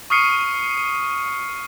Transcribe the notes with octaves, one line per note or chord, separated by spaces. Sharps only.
C#6 D#6 F6 C7 C#7 D#7